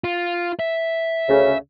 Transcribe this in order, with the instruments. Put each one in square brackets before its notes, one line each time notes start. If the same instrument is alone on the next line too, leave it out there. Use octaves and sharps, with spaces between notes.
[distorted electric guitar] F4
E5
[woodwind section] D2 C#3